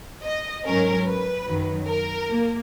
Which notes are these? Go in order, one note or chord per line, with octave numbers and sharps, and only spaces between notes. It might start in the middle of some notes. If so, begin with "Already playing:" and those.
D#5
G#2 F#3 C#4 A#4
B4
F#2 D#3 F#3
A#4
A#3